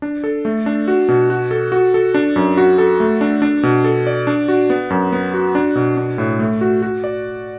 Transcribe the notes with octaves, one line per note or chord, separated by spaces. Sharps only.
D4
A4
A3
D4
F#4
B2
F#4
A4
F#4
A4
D4
F#2
F#4
A4
A3
D4
D4
B2
A4
D5
D4
F#4
B3
F#2
B3
F#4
D4
B2
D4
A2
A3
F#4
F#4
D5